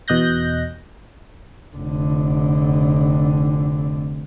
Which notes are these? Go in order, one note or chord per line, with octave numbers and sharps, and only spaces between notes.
E2 B2 D#5 F#6 G6 A#6
F1 D3